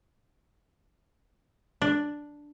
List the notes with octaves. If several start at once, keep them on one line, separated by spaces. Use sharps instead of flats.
D4